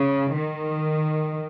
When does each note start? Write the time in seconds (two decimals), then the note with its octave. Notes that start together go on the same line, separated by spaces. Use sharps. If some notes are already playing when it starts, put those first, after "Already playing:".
Already playing: C#3
0.36 D#3